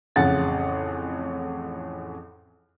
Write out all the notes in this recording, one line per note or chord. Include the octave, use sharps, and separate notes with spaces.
A1 F2 C#3 G#4 F#5 A6